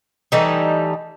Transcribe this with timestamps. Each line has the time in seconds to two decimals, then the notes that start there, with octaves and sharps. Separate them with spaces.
0.32 E3 G3 A3 D#4